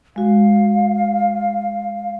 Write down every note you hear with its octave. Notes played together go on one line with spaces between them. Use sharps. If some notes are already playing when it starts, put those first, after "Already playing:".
G#3 F#4 F5